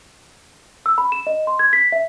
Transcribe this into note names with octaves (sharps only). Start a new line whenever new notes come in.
E6
B5
E7
D#5
C6
G#6
B6
E5